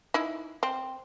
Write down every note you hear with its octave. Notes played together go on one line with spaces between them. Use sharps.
D#4 E4
C4